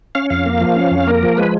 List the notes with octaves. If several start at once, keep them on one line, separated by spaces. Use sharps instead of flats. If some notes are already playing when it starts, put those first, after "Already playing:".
C#4 F5
F2 F5
A#3
F3
C#4
F2
A#3 A#4
F3
G#3 B4